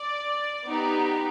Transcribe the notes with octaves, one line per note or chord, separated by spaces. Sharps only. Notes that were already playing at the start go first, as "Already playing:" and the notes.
Already playing: D5
B3 D#4 G4